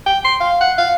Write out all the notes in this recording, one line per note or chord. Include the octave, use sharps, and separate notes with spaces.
G5
C6
F5
F#5
F5